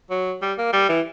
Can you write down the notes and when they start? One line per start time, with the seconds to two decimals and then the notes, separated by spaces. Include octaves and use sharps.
0.10 F#3
0.42 G3
0.58 A#3
0.73 G3
0.89 E3